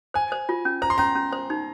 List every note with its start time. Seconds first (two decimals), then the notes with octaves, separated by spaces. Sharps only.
0.14 C5 G#5
0.32 C5
0.49 F4
0.65 C#4
0.82 C5 A#5
0.90 C6
0.98 C#4 A#5
1.15 C#4
1.33 C5
1.50 D#4